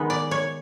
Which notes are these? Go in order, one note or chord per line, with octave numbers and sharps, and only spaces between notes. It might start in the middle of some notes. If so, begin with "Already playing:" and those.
Already playing: D#3 G#3 B3 D#4
D5
C#5